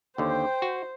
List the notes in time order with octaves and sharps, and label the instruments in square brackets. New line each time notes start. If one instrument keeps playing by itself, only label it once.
[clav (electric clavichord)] D#2 D3 [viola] C5 [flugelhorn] G5
[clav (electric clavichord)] F#4